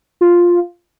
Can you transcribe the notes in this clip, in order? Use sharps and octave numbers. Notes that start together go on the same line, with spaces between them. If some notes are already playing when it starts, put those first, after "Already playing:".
F4